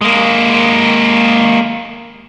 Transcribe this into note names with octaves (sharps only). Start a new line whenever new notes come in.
G#3 A#3